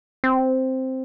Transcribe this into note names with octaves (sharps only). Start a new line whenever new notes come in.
C4